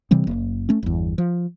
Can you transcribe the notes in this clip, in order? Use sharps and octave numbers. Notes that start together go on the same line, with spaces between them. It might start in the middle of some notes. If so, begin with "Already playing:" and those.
C3 E3 G3 C4
F#1 A#3
A3 C#4
G1 E2
F3